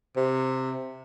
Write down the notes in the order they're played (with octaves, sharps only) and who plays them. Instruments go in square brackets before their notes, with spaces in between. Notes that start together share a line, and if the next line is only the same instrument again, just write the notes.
[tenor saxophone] C3